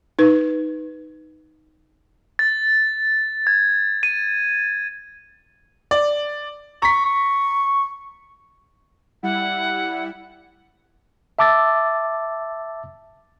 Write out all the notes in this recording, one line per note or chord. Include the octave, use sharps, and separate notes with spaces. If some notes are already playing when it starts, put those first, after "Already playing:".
D#4 B4
A6
G#6
D#7
D5
A#5 C#6 B6
C#6
G3 E4 F#5
E5 A5 D6 E6 A6